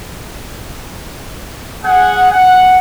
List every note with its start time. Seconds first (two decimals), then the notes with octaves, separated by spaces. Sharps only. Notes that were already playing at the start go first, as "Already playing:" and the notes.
1.84 G#4 F#5
2.31 F#5